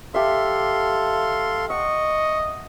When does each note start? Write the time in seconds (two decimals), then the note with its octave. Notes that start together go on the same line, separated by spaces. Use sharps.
0.14 G4 A4 E5 F5 C6
1.70 D#5 F#5 C#6